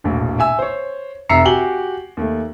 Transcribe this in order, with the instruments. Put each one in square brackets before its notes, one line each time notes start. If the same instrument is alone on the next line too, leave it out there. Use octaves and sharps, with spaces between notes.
[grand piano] E1 A#1 A2
E5 G#5 E6
C5 C#5
F1 E5 A#5 E6 C7 C#7
F#4 G4 G#5 F#7 G7
D#2 A3